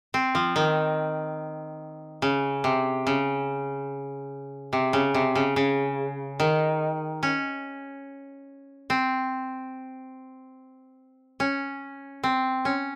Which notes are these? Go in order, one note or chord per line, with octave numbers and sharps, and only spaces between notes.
C4
F3
D#3
C#3
C3
C#3
C3
C#3
C3
C#3
C#3
D#3
C#4
C4
C#4
C4
C#4